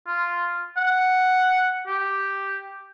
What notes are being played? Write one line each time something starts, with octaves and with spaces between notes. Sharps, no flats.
F4
F#5
G4